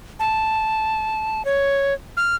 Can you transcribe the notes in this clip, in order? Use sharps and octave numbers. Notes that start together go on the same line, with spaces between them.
A5
C#5
F6